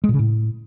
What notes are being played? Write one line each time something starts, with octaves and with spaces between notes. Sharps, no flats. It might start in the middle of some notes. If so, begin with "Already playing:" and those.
G#3
A#2
C#3
A2